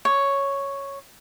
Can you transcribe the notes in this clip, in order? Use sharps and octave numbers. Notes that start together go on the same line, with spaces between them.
C#5